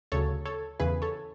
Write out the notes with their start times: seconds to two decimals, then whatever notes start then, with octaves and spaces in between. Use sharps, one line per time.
0.12 D2 C#3 F#3 A4 C#5
0.45 A4 C#5
0.80 E2 C#3 E3 G#4 B4
1.02 A4 C#5